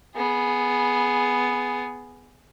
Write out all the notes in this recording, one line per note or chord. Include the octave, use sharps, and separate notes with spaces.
B3 G#4